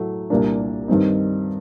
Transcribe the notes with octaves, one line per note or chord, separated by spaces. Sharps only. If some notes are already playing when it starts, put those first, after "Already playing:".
Already playing: A2 F#3 A3
C2 A#2 G3 A#3 D4
G2 D#3 G3 C4 D#4